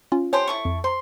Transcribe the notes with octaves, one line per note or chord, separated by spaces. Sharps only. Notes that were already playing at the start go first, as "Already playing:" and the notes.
C#4 F4
G4 C5 C#5 G#5 A5
E4 A4 C#6
F2
C5 A#5 C6